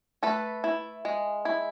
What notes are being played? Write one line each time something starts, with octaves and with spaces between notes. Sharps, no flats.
A3 A4 B4
E4
G#3
E4